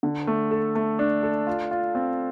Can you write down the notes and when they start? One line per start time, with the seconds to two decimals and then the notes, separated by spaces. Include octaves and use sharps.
0.03 D3
0.27 A3
0.51 A4
0.75 A3
0.99 D4
1.23 A4
1.47 F4
1.71 F4
1.95 C4